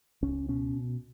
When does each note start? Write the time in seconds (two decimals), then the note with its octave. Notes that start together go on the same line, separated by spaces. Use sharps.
0.22 C#2 C#4
0.48 B2 C#4